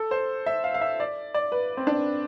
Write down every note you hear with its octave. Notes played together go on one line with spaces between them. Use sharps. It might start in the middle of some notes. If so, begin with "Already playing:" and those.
Already playing: A4
C5
E5
F5
F5
E5
D5
D5
B4
C4
D4